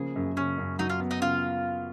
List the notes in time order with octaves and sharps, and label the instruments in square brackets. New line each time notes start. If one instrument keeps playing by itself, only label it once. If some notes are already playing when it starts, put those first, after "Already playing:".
Already playing: [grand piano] C#3 F3 A#3 [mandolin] G#4
[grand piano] F#2
[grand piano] C#3 [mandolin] C#4
[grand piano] F#2
[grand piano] F#3 [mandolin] D#4
[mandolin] F4
[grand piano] B3
[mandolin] D#4
[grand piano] C#3 [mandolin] F4